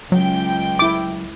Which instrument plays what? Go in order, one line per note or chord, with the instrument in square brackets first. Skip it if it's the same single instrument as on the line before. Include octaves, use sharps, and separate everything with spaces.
[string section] C#2 G5 [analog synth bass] F#3
[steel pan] E4 D6